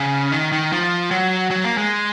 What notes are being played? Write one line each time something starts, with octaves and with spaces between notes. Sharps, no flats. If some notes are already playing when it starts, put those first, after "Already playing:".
Already playing: C#3
D#3
D#3
F3
F#3
F#3
A#3
G#3